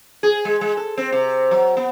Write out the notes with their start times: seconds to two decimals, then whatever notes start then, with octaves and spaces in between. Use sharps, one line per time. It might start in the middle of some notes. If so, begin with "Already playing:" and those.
0.23 G#4
0.45 G#3
0.61 G#3
0.77 A4
0.97 C4
1.12 C3
1.51 F#3
1.77 B3